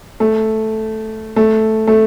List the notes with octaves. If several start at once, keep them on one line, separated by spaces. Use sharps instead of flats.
A3
A3
A3